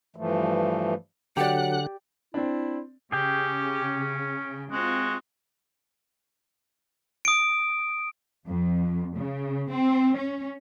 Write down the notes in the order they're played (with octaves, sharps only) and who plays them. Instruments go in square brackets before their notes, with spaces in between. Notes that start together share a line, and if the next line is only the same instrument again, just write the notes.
[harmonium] G2 E3 F3 A3
[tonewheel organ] D3 F#6 [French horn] F#3 [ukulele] G4 D5 [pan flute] F#5
[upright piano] C4 D4 [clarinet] E4
[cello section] C#3 [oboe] C#4 [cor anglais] G4 [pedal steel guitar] G#4 G5
[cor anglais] G#3 [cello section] C4 F4 [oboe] F#4
[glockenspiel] D#6 D7
[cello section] F2
C#3
C4
C#4